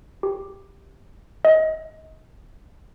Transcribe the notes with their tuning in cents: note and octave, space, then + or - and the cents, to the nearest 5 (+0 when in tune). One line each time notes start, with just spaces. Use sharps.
G4 +5
D#5 +25